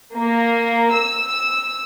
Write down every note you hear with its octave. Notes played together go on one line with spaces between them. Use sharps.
A#3
E6